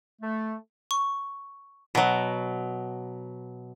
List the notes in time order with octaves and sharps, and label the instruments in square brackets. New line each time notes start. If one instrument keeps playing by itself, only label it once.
[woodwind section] A3
[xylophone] C#6
[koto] B2 F#3